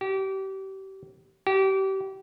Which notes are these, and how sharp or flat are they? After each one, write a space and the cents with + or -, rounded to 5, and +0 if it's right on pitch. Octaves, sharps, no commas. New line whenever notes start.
G4 -30
G4 -30